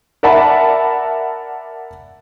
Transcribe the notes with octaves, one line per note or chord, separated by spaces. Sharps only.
A#4 D5 E5 F#5 A5 B5